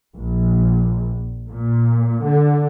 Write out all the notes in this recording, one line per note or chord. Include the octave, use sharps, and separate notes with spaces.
A#1
A#2
D3